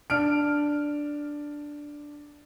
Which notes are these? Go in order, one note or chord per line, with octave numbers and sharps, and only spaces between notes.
D4 F6 D7